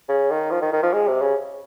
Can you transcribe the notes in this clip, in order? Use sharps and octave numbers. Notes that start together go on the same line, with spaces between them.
C#3
D#3
F3
D#3
D#3
F3
G#3
C3
C#3